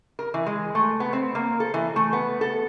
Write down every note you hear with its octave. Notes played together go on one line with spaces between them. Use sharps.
A#4
E3
G#3
A3
B3
C4
A#3
A4
E3
A3
B3
A4